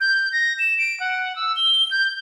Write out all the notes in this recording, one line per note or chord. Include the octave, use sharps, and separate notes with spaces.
G6
A#6
E7
D7
F#5
E6
G7
G6